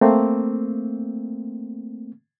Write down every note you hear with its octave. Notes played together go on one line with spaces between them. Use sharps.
A3 A#3 C4